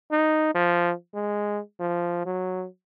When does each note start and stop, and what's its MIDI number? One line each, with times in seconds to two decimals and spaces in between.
0.11 0.51 63
0.55 0.92 53
1.14 1.59 56
1.80 2.21 53
2.26 2.65 54